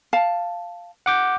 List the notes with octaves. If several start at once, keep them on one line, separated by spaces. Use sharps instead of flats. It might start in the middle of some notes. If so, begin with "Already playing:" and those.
F5 A5
F#5 D6 G6